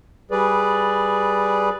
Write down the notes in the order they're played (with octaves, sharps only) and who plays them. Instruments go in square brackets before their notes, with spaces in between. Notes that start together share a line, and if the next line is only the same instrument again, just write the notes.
[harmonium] G3 G#4 B4 D5